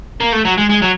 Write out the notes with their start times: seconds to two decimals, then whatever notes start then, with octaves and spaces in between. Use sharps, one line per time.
0.21 A#3
0.33 A3
0.45 F#3
0.58 G#3
0.70 G#3
0.82 F#3